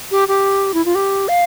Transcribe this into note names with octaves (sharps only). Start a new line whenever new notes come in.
G4
G4
E4
F4
G4
F5